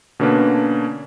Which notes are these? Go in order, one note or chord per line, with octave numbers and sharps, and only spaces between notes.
B2 D3 A#3 C#4 D4 B4